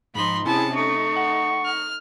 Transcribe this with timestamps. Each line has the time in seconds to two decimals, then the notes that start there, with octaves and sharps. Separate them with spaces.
0.15 G#2 F3 D#4 B5 C6
0.46 C3 C#4 D4 E4 G#4 C#5 A5
0.76 A3 D#4 C#6
1.16 F#5
1.65 F6